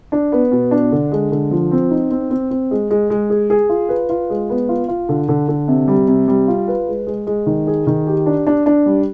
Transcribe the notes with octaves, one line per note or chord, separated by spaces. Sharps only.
D4
B3
B2
D4
D3
G#3
D3
F3
C4
D#4
C4
C4
C4
G#3
G#3
G#3
G#4
G#4
F4
B4
F4
G#3
B3
F4
F4
D3
D3
D3
C3
G3
C3
G3
F4
B4
G#3
G#3
G#3
D#3
G#4
D#3
G4
D4
D4
D4
G3